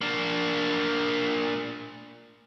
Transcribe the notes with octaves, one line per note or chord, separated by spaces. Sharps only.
A#3 D4